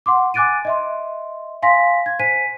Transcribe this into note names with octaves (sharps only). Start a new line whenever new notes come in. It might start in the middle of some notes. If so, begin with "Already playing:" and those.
F#5 C6 D6
G#5 D6 F#6 A6 D7 D#7
D#5 E5 C6
F5 G#5 C6 A#6 B6
G#6
C5 G#5 B6 D#7